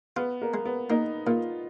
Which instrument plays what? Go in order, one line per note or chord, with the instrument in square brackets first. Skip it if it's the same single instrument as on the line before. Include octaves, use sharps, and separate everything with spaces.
[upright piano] B3 [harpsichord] F4
[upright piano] A#3
[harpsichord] G#3
[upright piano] B3
[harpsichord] A#3 [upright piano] D#4
[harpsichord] A#2 [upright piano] F4